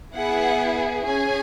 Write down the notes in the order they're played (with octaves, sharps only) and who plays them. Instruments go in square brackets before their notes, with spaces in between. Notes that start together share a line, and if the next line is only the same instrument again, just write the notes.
[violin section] B3 E4 G#4 F#5
C#4 G#4 G#5